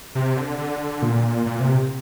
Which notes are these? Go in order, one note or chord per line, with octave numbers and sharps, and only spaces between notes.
C3
D3
D3
A#2
A#2
C3